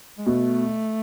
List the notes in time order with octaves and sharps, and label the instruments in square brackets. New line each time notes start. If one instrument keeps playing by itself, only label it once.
[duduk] G#3
[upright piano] B2 [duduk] A3